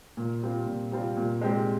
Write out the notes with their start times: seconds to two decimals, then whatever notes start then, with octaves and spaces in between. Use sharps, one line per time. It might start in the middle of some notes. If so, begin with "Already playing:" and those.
0.17 A#2
0.43 G3 C4 F4
0.67 A#2
0.92 G3 C4 F4
1.17 A#2
1.41 G#3 C4 G4